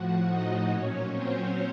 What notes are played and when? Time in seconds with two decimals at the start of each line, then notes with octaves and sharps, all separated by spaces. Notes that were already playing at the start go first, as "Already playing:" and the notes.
Already playing: A2 F3 F#4 F#5
0.29 D#4 D#5
0.71 A#2 F#3 C#4 C#5
1.12 C4 C5